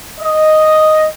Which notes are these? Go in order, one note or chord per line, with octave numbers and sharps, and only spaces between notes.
D#5